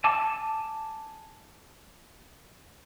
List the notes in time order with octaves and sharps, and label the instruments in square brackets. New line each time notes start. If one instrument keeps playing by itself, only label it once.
[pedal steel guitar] G#5 A5 D6 E6